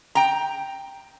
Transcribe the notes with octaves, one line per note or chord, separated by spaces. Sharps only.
G5 A#5